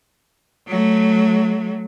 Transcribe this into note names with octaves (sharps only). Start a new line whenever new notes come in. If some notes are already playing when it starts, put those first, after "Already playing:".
F#3 A3